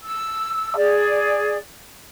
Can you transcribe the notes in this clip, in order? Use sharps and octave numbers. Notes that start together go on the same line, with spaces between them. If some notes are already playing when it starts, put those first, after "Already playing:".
E6
G#4 D5